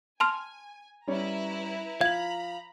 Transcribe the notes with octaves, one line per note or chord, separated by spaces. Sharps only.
G#5 A5 C6 F6
G3 C#4 E4 B4 C#5 A#5
F3 F5 A#5 B5 G#6 F#7